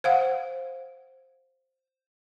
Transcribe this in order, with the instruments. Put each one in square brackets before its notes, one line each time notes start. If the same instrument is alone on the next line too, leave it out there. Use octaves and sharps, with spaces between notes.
[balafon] C5 F5 F#5